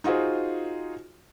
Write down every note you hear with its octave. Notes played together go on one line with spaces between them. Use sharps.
D#4 F4 F#4 G#4 C5